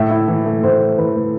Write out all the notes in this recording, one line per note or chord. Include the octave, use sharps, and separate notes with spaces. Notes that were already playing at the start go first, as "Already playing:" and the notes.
Already playing: A2 E5
E4
E3
A3
A2 C5
E4
E3 B4
A3